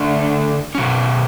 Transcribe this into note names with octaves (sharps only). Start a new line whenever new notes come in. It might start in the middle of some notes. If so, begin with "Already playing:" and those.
Already playing: D3 A3 D4
B2 F#3 C#4